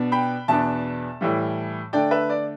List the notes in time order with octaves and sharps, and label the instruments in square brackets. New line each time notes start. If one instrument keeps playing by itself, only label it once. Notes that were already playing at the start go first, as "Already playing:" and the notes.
Already playing: [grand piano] B2 B3 D4
G5 B5
E2 B2 B3 D4 E5 A5
A2 E3 G3
D3 A3 D4 D5 G5
B4 E5
D5